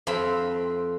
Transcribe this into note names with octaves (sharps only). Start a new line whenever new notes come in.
F2 C4 B5